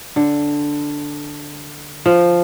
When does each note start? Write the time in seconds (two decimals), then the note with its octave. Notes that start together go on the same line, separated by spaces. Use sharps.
0.16 D3
2.06 F3